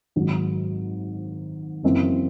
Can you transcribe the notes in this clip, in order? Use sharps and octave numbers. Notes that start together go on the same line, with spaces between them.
G#1 G#2 D#3 F#3
F#1 F#2 C#3 E3 C4